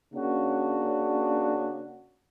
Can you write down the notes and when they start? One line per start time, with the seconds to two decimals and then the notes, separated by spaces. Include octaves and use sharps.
0.14 C#3 A#3 C#4 D4 F#4